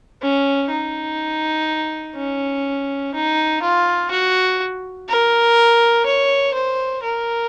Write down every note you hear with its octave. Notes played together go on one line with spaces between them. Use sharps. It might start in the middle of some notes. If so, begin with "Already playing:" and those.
C#4
D#4
C#4
D#4
F4
F#4
A#4
C#5
C5
A#4